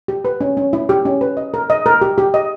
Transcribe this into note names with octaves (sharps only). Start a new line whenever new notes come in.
G4
B4
C#4
C#4
E4
G4
C#4
B4
D#5
A#4
D#5
A#4
G4
G4
D#5